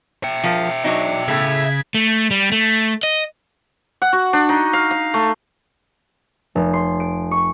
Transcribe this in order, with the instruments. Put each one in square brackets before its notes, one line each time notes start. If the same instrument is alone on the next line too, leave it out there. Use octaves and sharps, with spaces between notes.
[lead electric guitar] E5 G5
[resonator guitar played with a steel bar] F3 A#4
F#3 D4 D#4
[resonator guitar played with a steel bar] A2 A3 [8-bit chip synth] C#3 G#6 B6
[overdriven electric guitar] A3
G3
A3
D#5
[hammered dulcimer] F#5
F#4
D4
D#4
F5
F5
A3
[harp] F1
C6
D7
C#6